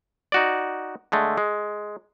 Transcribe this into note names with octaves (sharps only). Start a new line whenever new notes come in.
D#4 F#4 D5
D3 G#3 A3
G#3